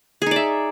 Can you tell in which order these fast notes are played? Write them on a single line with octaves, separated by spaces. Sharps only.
G#4 D#4 D5 E5